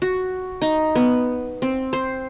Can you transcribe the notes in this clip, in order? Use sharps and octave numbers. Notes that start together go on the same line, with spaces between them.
F#4
D#4
B3
C4
C5